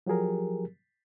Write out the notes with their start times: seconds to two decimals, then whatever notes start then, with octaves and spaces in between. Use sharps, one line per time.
0.06 F3 F#3 G4 G#4 A#4